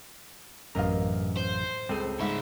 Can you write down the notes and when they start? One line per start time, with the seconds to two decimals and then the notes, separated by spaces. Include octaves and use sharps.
0.75 A1 F#2 A#4 D#5 F5 A#5
1.37 C5
1.89 C#2 C4 A4 D#7
2.20 C#2 G#2 E5 B5